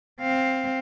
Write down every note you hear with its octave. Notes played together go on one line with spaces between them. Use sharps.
C4 F5